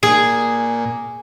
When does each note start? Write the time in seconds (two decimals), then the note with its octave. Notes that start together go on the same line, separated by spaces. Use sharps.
0.03 A#2 G#4